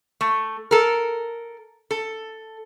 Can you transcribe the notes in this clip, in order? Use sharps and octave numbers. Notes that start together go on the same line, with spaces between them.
A3
A4 A#4
A4